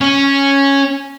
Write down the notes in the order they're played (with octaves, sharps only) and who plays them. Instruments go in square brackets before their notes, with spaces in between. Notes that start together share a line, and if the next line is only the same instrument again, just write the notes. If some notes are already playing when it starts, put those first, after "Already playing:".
[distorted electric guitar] C#4